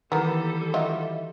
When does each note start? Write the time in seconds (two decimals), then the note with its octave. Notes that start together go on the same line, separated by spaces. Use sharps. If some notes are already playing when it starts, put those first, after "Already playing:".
0.12 D#3 E3 G3 A#3 B3 A4 A#5
0.74 F#3 F4 D#5 E5